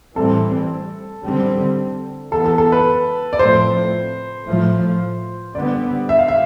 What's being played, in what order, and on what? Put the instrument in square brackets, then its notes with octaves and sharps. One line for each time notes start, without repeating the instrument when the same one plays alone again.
[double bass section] A2 E3 G3 C4 [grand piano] A4
[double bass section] D3 G3 C4
[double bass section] E3 B3 [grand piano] A4
[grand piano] A4
A4
B4
D5
[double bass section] A2 F3 A3 C4 [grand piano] C5
[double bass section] A2 F3 A3
[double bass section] D3 G3 B3 [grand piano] D5
[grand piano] E5
F5
E5